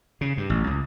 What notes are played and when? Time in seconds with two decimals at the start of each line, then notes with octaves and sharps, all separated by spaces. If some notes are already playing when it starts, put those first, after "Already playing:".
0.21 C#3
0.37 G2
0.50 A1
0.67 C#2